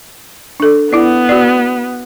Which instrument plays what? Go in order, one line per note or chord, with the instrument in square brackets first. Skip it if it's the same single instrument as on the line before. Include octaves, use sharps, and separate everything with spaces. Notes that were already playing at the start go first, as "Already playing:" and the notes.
[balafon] D4 A4
[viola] B3 [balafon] E4 D5
[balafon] F#4 D5